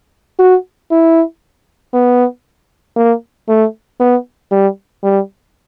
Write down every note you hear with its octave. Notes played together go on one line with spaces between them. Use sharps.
F#4
E4
B3
A#3
A3
B3
G3
G3